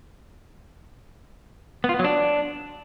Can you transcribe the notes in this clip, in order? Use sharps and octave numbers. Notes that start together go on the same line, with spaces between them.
B3
F4
B3
F#3
D4